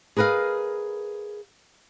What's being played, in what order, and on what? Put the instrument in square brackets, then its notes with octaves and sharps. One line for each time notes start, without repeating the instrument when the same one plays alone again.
[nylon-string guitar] G#4 A#4 B4 D#5 F5